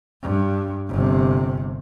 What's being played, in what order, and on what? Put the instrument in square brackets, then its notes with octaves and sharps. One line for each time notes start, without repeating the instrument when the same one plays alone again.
[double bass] G2
G1 C3